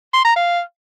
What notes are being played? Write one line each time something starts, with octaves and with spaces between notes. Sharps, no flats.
C6
A#5
F5